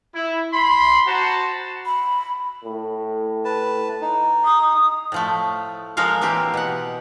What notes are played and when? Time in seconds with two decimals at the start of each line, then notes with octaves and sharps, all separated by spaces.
0.13 E4
0.53 B5 C6
1.07 F#4 C5 F#5 A5 A#5
1.85 B5
2.64 A2
3.45 B4 A5
4.01 D#4
4.45 D#6
5.12 A2 F3 A3
5.97 F3 G#3 A#4 C#5 F5
6.21 E3 A#3 C4 G4
6.54 B2 F#5